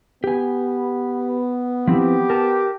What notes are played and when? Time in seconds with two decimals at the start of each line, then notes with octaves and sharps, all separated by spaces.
0.24 B3 G4 G#5
1.87 F3 C4 E4 G4
2.30 A#4 A5